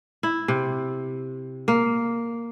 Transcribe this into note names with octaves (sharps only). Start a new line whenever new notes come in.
E4
C3
A#3